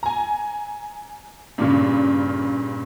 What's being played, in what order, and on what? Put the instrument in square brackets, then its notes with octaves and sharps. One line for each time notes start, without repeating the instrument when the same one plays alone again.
[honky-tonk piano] G#5 A#5
G2 A#2 C#3